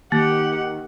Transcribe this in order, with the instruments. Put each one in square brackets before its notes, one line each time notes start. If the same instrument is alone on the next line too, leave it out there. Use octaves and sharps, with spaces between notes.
[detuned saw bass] D#3 [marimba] A#3 [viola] G4 F#5